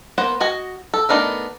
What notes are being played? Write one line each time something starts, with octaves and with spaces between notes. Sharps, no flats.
A#3 B3 C5 F#5
F#4 D#5 G#5
A4
A3 B3 D4 D#4 A#4